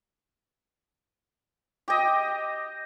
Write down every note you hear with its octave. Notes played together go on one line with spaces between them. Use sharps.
G4 D#5